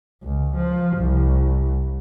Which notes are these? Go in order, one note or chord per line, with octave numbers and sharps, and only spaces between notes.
C#2
F3
C2